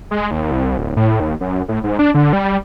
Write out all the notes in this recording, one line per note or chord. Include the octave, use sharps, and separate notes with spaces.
G#3
D#2
C2
D1
A2
D#2
F#2
A2
G#2
D4
D3
G3